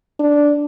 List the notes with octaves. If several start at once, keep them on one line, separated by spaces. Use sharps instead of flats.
D4